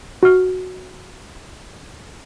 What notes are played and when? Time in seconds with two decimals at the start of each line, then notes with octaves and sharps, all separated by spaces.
0.23 F#4 F6